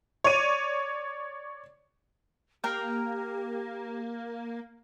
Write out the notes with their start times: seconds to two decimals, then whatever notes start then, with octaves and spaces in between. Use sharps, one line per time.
0.24 C#5 D5 D#7
2.64 A#3 G4 A#4 G5